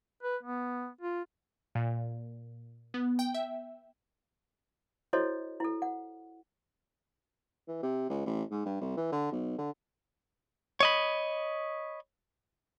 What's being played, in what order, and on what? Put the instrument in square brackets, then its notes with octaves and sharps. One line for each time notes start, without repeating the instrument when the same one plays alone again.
[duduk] B4
B3
F4
[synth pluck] A#2
B3
G5
E5
[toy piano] E4 F#4 A4 C5 C#5 D#5
E4 A4
F#5
[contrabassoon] E3
C3
C#2
A1
G#2
G2
C2
E3
D3
B1
D3
[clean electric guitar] C#5 D#5 B5